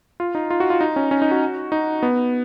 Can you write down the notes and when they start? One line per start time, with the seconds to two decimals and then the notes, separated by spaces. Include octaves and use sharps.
0.20 F4
0.35 D#4
0.50 F4
0.60 F#4
0.70 F4
0.81 D#4
0.96 C#4
1.11 C#4
1.22 D#4
1.31 F#4
1.72 D#4
2.03 B3